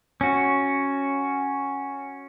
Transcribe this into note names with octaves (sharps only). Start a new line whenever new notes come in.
C#4 F#4